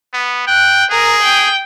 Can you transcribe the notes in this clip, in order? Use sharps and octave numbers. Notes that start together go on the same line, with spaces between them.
B3
G5 F#6
G#4 A#4
G5